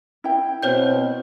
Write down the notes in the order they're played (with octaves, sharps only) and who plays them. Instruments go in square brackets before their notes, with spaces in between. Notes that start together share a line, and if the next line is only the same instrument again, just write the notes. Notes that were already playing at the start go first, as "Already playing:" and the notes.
[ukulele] E4 G5
[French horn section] B2 C4 [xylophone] C5 C#5 G6